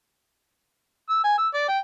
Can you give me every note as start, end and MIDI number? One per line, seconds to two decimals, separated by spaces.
1.10 1.19 88
1.24 1.38 80
1.38 1.48 88
1.54 1.67 74
1.68 1.78 79